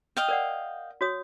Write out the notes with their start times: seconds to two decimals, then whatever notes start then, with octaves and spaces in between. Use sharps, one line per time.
0.17 D#5 F5 G5
0.29 A#4 D5 F#5
1.01 F#4 C#5 D#6